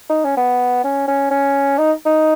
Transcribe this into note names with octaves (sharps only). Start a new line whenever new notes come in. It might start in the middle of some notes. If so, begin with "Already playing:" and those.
D#4
C#4
B3
C#4
C#4
C#4
D#4
D#4